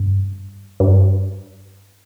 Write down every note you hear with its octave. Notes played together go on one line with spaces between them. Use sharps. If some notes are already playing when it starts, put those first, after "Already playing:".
Already playing: G2
G2